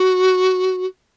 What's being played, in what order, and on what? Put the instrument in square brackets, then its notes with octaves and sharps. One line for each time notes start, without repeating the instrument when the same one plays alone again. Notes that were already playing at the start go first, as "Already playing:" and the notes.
Already playing: [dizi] F#4